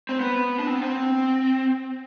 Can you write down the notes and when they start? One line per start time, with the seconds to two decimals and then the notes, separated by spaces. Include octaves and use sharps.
0.09 C4
0.20 B3
0.59 D4
0.67 C4
0.75 B3
0.83 C4